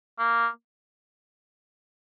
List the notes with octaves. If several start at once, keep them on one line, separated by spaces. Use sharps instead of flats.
A#3